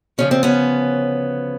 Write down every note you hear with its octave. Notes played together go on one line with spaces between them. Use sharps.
D2 C#3 F3 C#4
C4
B3 C#4